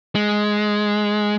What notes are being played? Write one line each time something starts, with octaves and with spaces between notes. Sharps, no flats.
G#3